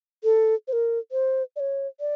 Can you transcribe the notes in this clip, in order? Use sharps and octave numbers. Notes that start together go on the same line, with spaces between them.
A4
C5
A#4
C5
D5
C#5
D5